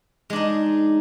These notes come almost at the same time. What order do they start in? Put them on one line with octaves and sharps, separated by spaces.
G#3 D4 D#4